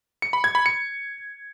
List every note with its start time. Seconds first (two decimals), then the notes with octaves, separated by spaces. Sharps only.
0.22 C#7
0.33 B5
0.44 G#6
0.55 B5
0.66 C#7